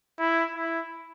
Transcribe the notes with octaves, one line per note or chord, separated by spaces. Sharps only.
E4
E4